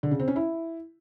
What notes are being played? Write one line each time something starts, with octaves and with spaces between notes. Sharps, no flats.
D3
C#3
C4
C#4
E4